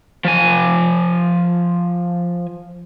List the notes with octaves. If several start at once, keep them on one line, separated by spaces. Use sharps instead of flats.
F3 G#5